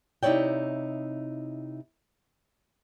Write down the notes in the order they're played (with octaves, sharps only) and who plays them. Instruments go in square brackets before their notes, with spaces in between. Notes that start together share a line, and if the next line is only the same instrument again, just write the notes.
[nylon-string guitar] C3 D#4 E4 C#5 D5 G5